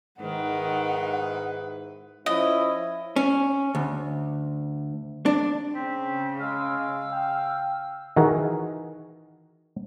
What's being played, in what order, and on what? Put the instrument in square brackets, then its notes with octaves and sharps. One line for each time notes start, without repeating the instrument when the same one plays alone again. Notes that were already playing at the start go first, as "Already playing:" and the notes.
[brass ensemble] G#2 E4 B4 [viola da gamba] D#3 [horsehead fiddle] F#5
[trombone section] F3 C#4 E4 [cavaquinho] D#5
[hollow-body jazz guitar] C#4
D2
D4
[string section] C#3 [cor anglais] C4 [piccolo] B6
[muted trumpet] G#3 [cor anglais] F5 [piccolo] E6
[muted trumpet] G5
[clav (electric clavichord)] D#3 E3 F#4 G#4 A#4